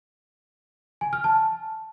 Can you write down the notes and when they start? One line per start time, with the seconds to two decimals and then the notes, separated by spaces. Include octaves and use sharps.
1.01 G#5
1.13 F6
1.24 A5